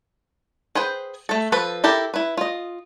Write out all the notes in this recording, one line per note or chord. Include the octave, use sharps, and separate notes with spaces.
G#4 B4 C5 G5
A3 A4
F3 A4 B4
E4 G4 A4 A#4
E4 B4
F4 D#5